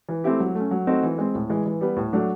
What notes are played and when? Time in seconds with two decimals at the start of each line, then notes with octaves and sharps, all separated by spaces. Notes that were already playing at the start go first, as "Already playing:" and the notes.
0.09 E3
0.24 A3 C4 E4 G4
0.40 F#3
0.55 A3
0.60 C#4
0.71 F#3
0.87 A3 C4 D#4 F#4
1.03 E3
1.18 G#3 C4
1.35 A2
1.49 E3 G#3
1.66 E3
1.81 G3 B3
1.97 A2
2.13 F#3 A3 D4 F#4